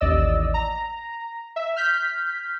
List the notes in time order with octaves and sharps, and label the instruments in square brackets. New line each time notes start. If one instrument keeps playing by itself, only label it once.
[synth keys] A1 D#2 D5 D#5 E6
A#5
E5
F6 G6 B6